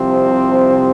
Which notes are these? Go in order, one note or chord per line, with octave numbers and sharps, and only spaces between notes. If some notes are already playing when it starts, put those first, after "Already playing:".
Already playing: C2 C3 F3 C4